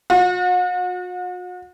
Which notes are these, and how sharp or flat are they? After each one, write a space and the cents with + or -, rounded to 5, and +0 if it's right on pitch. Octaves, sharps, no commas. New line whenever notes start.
F#4 -45